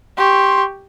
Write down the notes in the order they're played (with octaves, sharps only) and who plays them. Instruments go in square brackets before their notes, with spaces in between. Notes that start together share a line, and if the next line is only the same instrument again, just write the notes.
[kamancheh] G4 C#6 [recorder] C6